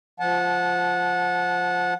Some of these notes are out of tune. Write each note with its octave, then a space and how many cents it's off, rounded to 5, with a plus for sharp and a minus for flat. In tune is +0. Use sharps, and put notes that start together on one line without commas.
F3 +0 F#5 -20 A5 -25